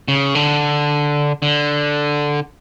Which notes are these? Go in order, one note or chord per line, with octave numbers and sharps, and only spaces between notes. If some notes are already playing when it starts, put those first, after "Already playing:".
C#3
D3
D3